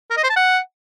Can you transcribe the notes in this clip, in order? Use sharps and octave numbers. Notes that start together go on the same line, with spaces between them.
A#4
D#5
C5
A5
F#5